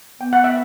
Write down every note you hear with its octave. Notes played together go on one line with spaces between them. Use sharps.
B3 G5
F#5
E5